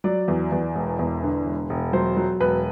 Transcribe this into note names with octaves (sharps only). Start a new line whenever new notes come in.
F#3 D5
E2
E2
E1
E2
D3
E1
E1
F#3 C5
F#3
E1 B4